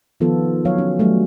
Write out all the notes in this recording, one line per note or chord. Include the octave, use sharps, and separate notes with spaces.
D#3 F3 B3 F4 A4
F#3 C#5 F5
C#4
F#3 G3 A3